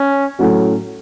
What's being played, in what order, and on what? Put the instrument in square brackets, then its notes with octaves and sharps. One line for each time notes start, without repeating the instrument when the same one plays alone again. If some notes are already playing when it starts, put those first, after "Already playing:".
Already playing: [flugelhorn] C#4
[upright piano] A2 F#3 A3 C#4 F#4